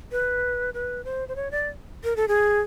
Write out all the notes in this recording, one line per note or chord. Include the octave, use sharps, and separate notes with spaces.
B4
B4
C5
C5
C#5
D5
A#4
A4
G#4